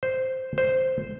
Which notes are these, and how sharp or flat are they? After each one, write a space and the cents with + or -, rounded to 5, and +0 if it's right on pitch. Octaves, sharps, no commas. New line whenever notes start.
C5 -5
C5 -5